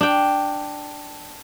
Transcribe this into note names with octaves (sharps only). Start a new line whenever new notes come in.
D4 G5